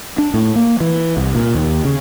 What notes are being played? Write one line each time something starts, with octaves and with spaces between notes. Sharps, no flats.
D4
A2
A#3
E3
C2
A#2
D#2
C#3